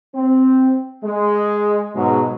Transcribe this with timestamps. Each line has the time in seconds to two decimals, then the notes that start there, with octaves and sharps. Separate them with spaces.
0.14 C4
1.04 G#3
1.95 G#2 B2 F#3 G#3